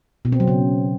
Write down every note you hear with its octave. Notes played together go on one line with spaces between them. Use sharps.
B2
C4
F#3
C#3